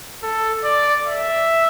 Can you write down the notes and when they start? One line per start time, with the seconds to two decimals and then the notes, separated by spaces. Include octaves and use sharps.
0.23 A4
0.64 D5
1.07 E5